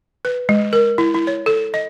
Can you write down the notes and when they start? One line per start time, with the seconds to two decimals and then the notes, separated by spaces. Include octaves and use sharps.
0.25 B4
0.49 G#3
0.73 A#4
0.98 E4
1.14 E4
1.27 C#5
1.46 A4
1.74 D#5